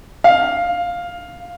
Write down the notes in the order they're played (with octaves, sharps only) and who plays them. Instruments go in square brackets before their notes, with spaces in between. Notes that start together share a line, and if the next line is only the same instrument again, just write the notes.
[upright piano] F5